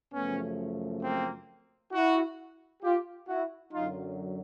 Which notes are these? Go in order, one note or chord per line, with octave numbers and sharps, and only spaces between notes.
F#2 C#3 F3 A3 B3 C#4
A#3 C4
E4 F#4
F4 G4
E4 F#4
F#2 D3 F#3 D#4 F4